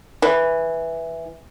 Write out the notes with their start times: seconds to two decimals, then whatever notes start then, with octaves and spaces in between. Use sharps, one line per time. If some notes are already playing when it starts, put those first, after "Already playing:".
0.22 E3